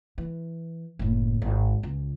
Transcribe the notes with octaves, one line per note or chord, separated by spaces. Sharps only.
E3
F#1 A2
G#1
C#2